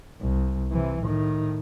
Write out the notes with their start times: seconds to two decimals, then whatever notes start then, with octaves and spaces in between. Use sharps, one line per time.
0.21 C2
0.71 C3 E3
1.02 A2 D#3